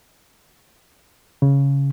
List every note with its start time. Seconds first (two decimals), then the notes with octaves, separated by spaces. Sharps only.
1.42 C#3